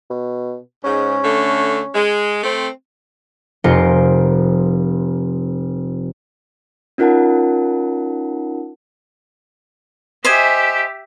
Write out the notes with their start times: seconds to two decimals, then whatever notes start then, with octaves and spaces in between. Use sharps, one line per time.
0.10 B2
0.84 G#2 C#4
1.24 D3 A3
1.95 G#3
2.44 A3 C4
3.64 F1 F4 A#4 C5 C#7 D7
6.98 C#4 D#4 F4 A#4 F#5 A5
10.24 G4 C5 D#5 E5 G#5